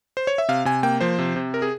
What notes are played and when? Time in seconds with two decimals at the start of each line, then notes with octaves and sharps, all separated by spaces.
0.17 C5
0.27 C#5
0.38 E5
0.49 C3 F5
0.65 C3 G#5
0.83 A#3 G5
1.01 F3 C5
1.19 C3
1.36 C3
1.54 A#4
1.62 G#4